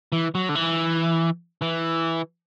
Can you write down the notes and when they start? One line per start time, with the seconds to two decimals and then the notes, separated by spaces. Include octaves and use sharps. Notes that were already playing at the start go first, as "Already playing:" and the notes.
0.12 E3
0.35 F#3
0.49 D3
0.55 E3
1.62 E3